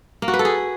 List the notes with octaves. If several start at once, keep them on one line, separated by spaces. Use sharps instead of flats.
A#3
F#4
B4
A4
G#4